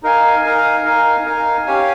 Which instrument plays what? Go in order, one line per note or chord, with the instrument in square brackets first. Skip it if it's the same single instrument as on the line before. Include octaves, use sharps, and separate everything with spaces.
[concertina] D#4 A#4 F5 G#5
D#4 A#4 F5 G#5
D#4 A#4 F5 G#5
D#4 A#4 F5 G#5
C#4 G4 C#5 F5 G#5